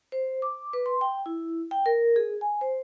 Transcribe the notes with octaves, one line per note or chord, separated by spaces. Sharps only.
C5
D6
B4
C6
G5
E4
G5
A#4
G#4
G#5
C5